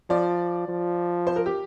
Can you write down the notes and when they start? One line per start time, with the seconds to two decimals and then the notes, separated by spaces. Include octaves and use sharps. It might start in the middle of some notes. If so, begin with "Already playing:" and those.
0.10 F3 D5
0.68 F3
1.27 C5
1.36 A#4
1.46 G4